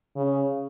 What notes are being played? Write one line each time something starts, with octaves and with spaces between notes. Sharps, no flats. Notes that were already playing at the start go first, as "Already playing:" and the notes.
C#3